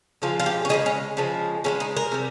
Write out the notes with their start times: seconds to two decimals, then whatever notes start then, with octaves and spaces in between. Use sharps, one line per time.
0.22 C#3 F3 G#3 F4
0.40 F4
0.46 G4
0.65 C#4
0.69 C#3 F3 G#3 D#4
0.86 C#4
1.17 C#3 F3 G#3
1.64 C#3 F3 G#3 C#4
1.80 D#4
1.97 A#4
2.12 C3 G3